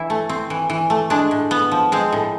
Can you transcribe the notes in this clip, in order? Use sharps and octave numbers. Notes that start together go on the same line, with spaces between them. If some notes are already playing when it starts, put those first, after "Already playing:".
Already playing: E3 E4
A3
C4
E3
E3
A3
G#3 D4
A2
B3
F3
G#3 C4
A2